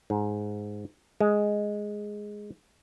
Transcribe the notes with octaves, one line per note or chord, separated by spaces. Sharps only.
G#2
G#3